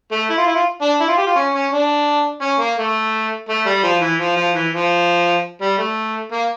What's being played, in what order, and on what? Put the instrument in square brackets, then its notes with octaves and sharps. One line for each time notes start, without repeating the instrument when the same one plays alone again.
[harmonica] A3
E4
F4
E4
F4
D4
E4
F4
G4
F4
C#4
C#4
D4
C#4
A#3
A3
A3
G3
F3
E3
F3
F3
E3
F3
G3
A3
A#3